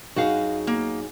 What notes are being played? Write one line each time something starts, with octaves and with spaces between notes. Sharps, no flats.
F#2 D#4 F#4 G#4 F5
A#3